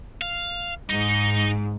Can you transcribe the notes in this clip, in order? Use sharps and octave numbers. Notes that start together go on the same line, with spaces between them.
F5
G#2 D#4